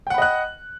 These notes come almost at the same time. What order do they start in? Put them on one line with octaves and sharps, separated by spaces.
G5 F#5 B5 D#5 F#6